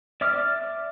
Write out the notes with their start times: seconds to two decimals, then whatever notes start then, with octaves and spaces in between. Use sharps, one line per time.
0.21 D5 E5 D6 F6